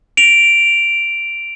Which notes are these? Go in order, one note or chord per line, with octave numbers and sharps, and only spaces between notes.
D7 F7